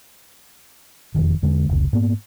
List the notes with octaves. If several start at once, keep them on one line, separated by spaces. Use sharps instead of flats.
E1 F2 D#3
E2 D3 G#3
F1 C#2
G#2 A#3 B3